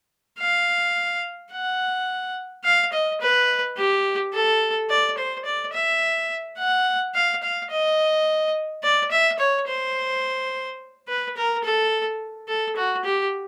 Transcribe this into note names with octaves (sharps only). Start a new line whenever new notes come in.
F5
F#5
F5
D#5
B4
G4
A4
D5
C5
D5
E5
F#5
F5
F5
D#5
D5
E5
C#5
C5
B4
A#4
A4
A4
F#4
G4